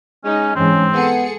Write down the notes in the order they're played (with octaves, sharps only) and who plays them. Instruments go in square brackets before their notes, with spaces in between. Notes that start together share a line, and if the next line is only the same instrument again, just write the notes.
[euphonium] G#3 [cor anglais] C#4 [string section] D#4
[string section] G#2 E3 G#3 [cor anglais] C4 [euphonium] C#4
[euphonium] B3 [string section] G#4 A4 C#7